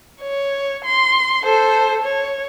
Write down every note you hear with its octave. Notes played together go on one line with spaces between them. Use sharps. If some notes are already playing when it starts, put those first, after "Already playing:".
C#5
C6
A4 C5
C#5